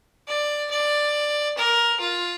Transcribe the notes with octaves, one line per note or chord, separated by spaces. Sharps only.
D5
D5
A#4
F4